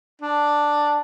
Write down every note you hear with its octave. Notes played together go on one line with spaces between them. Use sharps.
D4